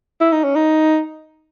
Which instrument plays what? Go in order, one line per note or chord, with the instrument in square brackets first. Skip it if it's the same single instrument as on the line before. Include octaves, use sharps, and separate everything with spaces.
[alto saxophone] E4
D#4
C#4
D#4